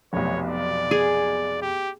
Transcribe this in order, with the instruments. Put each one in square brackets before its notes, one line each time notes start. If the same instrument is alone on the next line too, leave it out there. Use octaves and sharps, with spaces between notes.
[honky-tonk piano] F1 B1 [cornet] C#5
[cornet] D5
[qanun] G#4
[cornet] G4